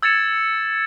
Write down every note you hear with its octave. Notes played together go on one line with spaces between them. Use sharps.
E6 G#6 A6 C#7 E7